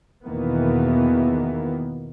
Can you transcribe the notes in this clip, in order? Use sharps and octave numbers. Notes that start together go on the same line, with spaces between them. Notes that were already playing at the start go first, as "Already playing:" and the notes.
E2 B2 D#3 E3 A#3 B3